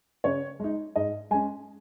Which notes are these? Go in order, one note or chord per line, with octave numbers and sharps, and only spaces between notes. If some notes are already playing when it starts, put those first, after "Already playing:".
C#3 C#5
G#3 D#4
G#2 D#5
G#3 C#4 G#5